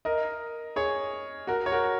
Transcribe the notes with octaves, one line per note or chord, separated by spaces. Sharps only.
A#4 D#5
G#4 C#5
F#4 A#4
C#5
F#4 A#4